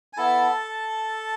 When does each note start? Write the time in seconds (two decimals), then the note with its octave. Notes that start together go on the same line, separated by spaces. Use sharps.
0.13 G#5
0.17 B3 E4 A4 A5